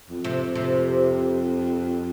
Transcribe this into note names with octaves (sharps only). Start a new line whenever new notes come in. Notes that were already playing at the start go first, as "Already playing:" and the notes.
F2
C3
C3